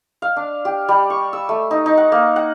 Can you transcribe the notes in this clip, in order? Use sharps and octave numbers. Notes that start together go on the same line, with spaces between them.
F5
D4
G4
G3
C#6
E6
A3
D#4
D#4
F#5
A#3
F#5